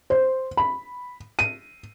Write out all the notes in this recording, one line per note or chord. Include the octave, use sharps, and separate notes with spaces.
C5
B5
D#7